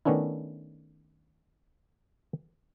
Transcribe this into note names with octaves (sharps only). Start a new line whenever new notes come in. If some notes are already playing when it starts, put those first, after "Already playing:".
D#3 A3 B3 C#4 D4 E4